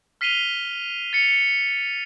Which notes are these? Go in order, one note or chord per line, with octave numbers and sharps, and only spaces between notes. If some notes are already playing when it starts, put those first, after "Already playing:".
F6 B6 C7 D#7 F7 G7
A6 C#7 F7